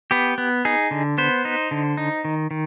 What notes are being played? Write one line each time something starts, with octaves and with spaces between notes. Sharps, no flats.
B3 G4
B3
D#4 G#4
D3
B3 C5
D#4
D3
D#4
D#3
D#3